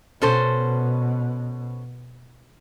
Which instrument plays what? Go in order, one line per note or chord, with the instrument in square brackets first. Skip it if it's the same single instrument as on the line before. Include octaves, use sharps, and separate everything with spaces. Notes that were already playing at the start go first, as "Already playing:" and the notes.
[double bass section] B2 [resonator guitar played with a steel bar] C#4 A4 C5